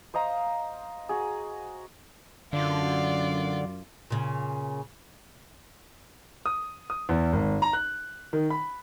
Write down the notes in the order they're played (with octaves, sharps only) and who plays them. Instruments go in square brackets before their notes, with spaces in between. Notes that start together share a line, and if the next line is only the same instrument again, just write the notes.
[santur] C5 D#5 F5 A#5
F#4 G#4
[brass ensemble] F#2 [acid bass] D3 [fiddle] F4 D5
[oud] A#2 C#3
[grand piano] D#6
D#6
E2
G#1
A#5
F#6
D#3
B5